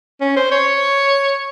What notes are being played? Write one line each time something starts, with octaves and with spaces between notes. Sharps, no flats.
C#4
C5
C#5